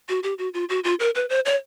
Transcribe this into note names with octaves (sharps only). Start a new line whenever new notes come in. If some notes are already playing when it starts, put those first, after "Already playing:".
F#4
G4
F#4
F4
F#4
F4
A#4
B4
C5
C#5